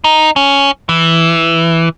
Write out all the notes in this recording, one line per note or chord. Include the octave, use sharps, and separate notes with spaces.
D#4
C#4
E3